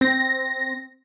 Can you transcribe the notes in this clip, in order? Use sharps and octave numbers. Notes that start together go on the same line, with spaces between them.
C4 A#6